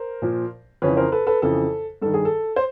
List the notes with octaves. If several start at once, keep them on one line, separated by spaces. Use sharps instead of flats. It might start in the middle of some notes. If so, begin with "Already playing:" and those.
Already playing: A#4 C5
A#2 F3
F2 C#3 E3 B4 C#5
A#4 C5
A4 B4
A4 B4
F2 C#3 E3 A4
G2 D#3 A4
G#4
A4
C5